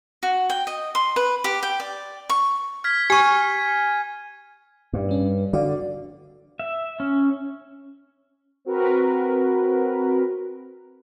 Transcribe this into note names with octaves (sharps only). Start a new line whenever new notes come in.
F#4
G5
D#5
C6
B4
G4
G5
D5
C#6
F6 G#6 B6
G4 G#5 C#6 G#6 D#7
G2
G3 C#4
D3 F#4 D5 F5
E5
C#4
C4 F#4 A#4 B4